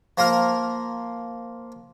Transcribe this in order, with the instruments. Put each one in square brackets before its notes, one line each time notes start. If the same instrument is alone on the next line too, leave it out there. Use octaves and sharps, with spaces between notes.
[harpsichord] F3 A#3 A#4